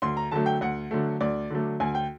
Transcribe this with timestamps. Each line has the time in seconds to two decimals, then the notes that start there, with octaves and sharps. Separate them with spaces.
0.02 D2 C6
0.17 A#5
0.31 D3 F#3 A3 A5
0.46 G5
0.61 D2 F#5
0.91 D3 F#3 A3
1.21 D2 D5
1.50 D3 F#3 A3
1.80 D2 G#5
1.95 G5